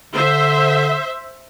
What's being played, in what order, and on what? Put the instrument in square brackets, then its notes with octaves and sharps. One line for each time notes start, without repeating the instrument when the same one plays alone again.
[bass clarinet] D3 [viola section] C5 E5